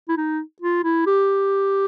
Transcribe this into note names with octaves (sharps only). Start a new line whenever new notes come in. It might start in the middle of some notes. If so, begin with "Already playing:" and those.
E4
D#4
F4
E4
G4